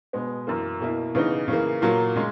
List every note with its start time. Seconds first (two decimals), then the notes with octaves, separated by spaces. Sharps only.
0.13 B2 G#3 B3
0.47 F#2 E3 A#3
0.80 B2 A#3 E4
1.15 C#3 E3 B3 D#4
1.48 C#3 E3 A#3
1.82 A#2 F#3 A#3
2.16 C#3 G#3